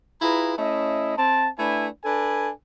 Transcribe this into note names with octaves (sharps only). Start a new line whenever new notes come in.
E4 F4 G#4 B4 A#5
A3 C#4 E4 D#5
C4 A5
A3 D4 E4 B4 G#5
D4 A4 B4 G#5